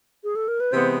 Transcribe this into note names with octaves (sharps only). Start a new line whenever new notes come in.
G#4
A4
A#4
B4
C3 E3 G#3 B3 C5